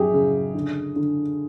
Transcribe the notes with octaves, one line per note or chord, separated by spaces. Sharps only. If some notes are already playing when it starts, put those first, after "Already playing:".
Already playing: F#2 G4 G#4
C#3
D3
D3